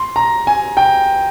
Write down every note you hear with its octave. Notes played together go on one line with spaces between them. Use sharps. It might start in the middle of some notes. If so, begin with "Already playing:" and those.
Already playing: C6
A#5
G#5
G5